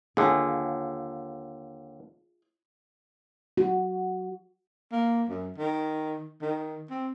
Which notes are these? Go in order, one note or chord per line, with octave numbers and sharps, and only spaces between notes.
D#2 D3 F4 G#4
F#4
A#3
F#2
D#3
D#3
C4